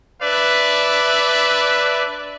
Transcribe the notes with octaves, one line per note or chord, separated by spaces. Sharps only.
D4 B4 D5 E5